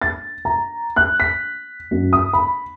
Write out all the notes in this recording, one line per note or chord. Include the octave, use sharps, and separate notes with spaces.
A6
A#5
F#6
B6
F#2
D#6
B5